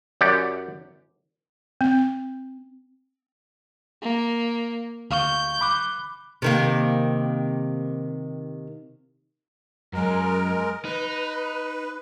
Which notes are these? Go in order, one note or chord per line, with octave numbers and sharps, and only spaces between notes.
F#2 G4 D5 F#5 G5
C4
A#3
D2 F5 C#6 G6
B5 D6 F#6
C3 D#3 A#3
F#2 F#3 G#3 A#4
D#4 B4